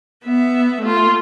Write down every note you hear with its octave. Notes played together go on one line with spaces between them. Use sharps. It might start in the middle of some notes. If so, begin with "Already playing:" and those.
B3 E5
A3 F4